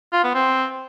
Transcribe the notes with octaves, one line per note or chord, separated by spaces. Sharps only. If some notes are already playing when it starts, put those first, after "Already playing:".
F4
B3
C4